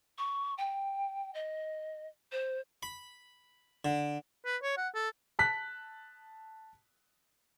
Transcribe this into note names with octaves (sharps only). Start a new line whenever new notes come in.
C#6
G5
D#5
C5
B5
D3
B4
C#5
F#5
A4
A5 F#6 B6